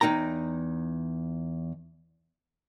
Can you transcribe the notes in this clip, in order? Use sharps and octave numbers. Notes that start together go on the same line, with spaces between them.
E2 F#3 D#4 G5 A#5